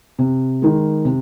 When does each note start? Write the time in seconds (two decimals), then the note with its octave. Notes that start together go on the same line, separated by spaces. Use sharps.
0.19 C3
0.62 D#3 G#3
1.05 C3